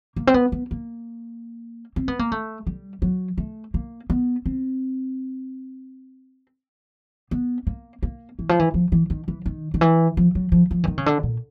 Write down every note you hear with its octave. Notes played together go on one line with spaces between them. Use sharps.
A#3
C4
B3
B3
A#3
C4
B3
A#3
A3
G3
F#3
A3
A#3
B3
C4
B3
A#3
A#3
E3
F3
E3
F3
E3
D#3
E3
D#3
D#3
E3
F3
F#3
F3
F3
E3
D#3
C#3
D3
A#2